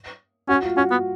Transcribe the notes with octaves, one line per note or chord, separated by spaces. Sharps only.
C#4 F#4
F4
C#4 F#4
B3